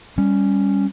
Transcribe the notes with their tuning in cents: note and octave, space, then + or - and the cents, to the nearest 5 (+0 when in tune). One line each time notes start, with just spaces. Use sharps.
G3 +20 C#4 +5